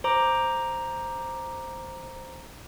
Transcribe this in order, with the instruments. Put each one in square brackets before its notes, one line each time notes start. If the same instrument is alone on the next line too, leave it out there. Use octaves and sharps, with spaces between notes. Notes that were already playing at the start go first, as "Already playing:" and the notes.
[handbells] C5 A#5 D6